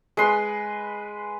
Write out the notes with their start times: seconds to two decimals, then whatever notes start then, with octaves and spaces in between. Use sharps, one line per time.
0.17 G#3 B4 C6